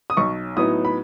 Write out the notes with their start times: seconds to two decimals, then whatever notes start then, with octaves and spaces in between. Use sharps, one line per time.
0.10 D#6
0.17 B1 C#6
0.57 A2 F#3 B3 D#4 D#6
0.85 B5